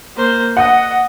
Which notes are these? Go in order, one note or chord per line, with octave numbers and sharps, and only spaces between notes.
A#3 C5
D#5 F#5